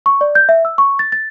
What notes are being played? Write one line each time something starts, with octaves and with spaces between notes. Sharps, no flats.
C#6
D5
G6
E5
E6
C#6
A6
A6